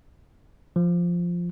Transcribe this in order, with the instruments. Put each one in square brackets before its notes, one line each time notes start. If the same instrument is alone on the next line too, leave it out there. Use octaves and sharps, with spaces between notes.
[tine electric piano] F3